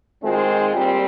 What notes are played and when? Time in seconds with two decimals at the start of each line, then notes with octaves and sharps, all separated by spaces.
0.21 G#2 D#3 G#3 C4 F4
0.72 A#2 G3 C4